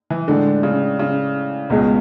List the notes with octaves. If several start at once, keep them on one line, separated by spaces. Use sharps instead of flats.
E3
A2 D3 G#3 D4
C#3
C#3
C#2 B2 G#3